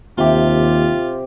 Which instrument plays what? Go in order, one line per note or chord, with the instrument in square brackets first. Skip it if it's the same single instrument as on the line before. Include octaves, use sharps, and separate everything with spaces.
[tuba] D#2 [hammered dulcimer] C3 G4 [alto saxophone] F4